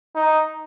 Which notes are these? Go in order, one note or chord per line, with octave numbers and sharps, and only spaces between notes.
D#4